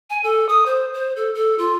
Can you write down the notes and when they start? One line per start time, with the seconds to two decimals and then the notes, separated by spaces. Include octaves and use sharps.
0.10 G#5
0.24 A4
0.49 D#6
0.66 C5
0.94 C5
1.16 A4
1.35 A4
1.59 F4